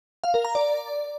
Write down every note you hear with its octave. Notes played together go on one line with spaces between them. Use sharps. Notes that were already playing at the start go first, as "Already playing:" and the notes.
F5
A#4
A#5
D5